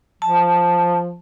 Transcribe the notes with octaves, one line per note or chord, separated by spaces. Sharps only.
F3 A5